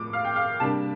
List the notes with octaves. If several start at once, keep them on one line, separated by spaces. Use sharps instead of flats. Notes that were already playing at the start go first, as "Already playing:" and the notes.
Already playing: A2 F3 A#3 D6
F5
G5
F5
C3 G3 A#3 D4 A5